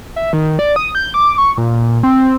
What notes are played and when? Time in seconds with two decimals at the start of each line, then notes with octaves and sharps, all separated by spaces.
0.16 E5
0.33 D#3
0.59 D5
0.76 D#6
0.95 G6
1.14 D6
1.38 C#6
1.58 A#2
2.03 C4